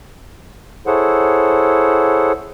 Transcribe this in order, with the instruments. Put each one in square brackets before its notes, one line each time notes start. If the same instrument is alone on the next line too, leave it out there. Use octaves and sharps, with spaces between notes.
[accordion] E4 G#4 A4 C5 C#5 F#5